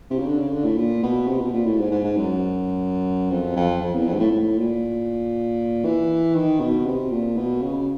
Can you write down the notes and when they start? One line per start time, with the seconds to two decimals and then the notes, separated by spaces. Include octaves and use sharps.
0.10 C3
0.19 C#3
0.27 D3
0.39 C#3
0.51 D3
0.64 A2
0.77 A#2
1.03 B2
1.28 C3
1.41 B2
1.53 A#2
1.66 A2
1.79 G#2
1.91 G#2
2.04 G#2
2.17 F#2
3.31 F2
3.56 F2
3.81 F2
3.94 E2
4.07 F2
4.14 G#2
4.19 A2
4.32 A2
4.58 A#2
5.85 E3
6.35 D#3
6.60 B2
6.86 C3
7.11 A#2
7.37 B2
7.62 C#3